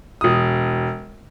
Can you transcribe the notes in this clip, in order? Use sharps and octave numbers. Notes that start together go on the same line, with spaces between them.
E1 D#6